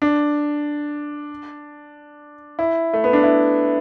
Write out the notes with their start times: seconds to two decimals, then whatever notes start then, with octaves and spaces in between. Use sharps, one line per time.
0.02 D4
2.59 E4
2.93 A3
3.04 B3
3.13 D4
3.23 E4